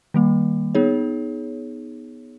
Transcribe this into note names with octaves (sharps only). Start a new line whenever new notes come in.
D#3 G3 A#3
B3 D#4 G#4 C#5